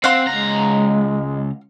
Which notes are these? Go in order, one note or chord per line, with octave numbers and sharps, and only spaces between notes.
C4 F5 F#5 C6
C#2 G#3 A#5